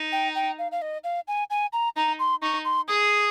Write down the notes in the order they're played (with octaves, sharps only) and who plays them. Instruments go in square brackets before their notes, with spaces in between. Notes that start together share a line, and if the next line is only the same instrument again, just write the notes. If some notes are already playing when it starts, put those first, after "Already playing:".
Already playing: [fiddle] D#4
[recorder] G5
G5
F5
F5
D#5
F5
G#5
G#5
A#5
[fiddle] D#4 [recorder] A#5
[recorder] C6
[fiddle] D#4 [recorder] C#6
[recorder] C6
[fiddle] G#4 [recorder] D#6